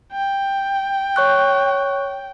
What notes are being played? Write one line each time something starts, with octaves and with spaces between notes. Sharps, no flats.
G5
C#5 C#6 F#6